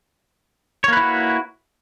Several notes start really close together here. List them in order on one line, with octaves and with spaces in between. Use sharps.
C#5 A#3 B4 E4 F#4